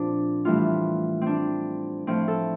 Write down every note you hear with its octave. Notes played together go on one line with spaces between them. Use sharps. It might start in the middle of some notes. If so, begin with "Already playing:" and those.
Already playing: A#2 F3 C4 D4
A2 E3 G3 F4
C4 D4
A2 F3 C4
A4